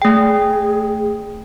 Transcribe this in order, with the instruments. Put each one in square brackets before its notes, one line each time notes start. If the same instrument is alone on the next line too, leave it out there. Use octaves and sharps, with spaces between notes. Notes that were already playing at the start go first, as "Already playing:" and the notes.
[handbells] A3 G5 [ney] G#4